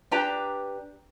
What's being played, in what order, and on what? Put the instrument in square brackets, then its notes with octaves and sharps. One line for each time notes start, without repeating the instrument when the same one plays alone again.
[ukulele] D4 G4 B4 A#5